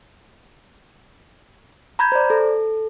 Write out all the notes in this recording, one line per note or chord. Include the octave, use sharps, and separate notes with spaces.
A#5 B5 G6 G#6
C5 D5
A4